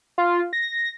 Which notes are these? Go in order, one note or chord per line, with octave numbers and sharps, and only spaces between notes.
F4
A#6